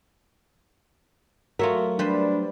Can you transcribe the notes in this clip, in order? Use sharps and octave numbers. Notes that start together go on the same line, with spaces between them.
F#3 A3 F4 A#4 C#5 E5
G3 D4 B4 C5